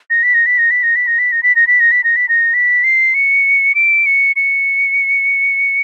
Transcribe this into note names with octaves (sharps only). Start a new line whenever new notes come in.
A#6
B6
A#6
B6
A#6
B6
A#6
B6
A#6
B6
A#6
B6
A#6
B6
A#6
B6
A#6
B6
A#6
B6
C7
C#7
D7
C#7
C#7